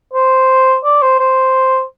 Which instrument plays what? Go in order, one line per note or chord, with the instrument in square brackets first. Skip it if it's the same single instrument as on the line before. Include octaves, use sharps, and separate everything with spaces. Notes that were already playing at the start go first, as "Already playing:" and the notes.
[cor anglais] C5
D5
C5
C5